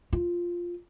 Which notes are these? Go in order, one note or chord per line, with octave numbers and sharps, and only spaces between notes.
F4